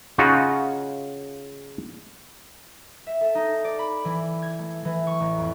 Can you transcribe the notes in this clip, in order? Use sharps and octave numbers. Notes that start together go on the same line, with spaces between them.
C#3 C#4 D#4 F4 F#4
E5
A4
D#4
D5
B5
E3
G#6
A3
E3
C#6
A1
F2